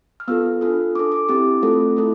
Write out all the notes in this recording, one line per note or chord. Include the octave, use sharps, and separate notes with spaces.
F6
B3 F4 A4 E6
D4 F4 A4
D4 A4 D6
D6
C4 E4 G4 D6
A3 C4 F4 A4
A3 E4 A4